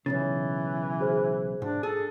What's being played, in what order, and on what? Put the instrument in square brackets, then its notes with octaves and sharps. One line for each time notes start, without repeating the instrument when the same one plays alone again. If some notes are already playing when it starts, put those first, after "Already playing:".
[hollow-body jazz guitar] B1 F#2 C#3 [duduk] E3 [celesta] C#5 A6
[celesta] F#4 G#4 C5
[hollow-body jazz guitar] G#2 [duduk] D4
[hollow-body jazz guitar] G#4 [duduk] A4